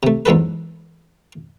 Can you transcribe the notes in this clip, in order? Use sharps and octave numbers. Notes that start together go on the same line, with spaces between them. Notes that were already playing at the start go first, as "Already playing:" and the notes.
C3 A3
E2 G#2 F#3 A4 B4